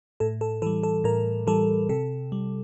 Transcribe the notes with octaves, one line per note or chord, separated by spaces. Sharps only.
A2 A4
A4
E3 G3 A4
A4
A2 A#4
E3 G3 A4
C3 A4
G3